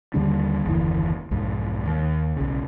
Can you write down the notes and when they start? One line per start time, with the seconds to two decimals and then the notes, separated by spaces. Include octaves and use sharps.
0.14 D#2 D3 G3 D4
0.65 F#1 D#2 D3 E3
1.31 B1 F2 G#2
1.86 D#2
2.36 B1 C#3